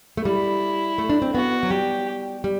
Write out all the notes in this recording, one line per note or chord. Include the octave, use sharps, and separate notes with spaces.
A3
G3 E4
A3
D4
C4
B3 F#4
F#3
G3 G4
G3